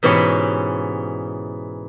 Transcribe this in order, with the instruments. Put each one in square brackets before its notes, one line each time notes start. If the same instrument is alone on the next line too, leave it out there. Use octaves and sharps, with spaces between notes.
[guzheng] G#2 B2 E3 C#4 G4 C#5